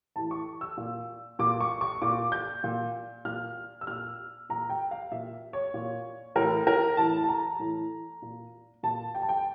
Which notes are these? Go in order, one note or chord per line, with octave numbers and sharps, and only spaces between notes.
A2 E3 A5
C#6
E6
A#2
A#2 D6
C#6
C#6
A#2 D6
G6
A#2
A#2 F6
E6
A#2 F6
A#2 A#5
G5
F5
A#2 E5
C#5
A#2
A2 E3 A#4
A#4
E3 A5
A2
A5
A#5
A2 E3
A#2
A#2 A5
G5
A5
G5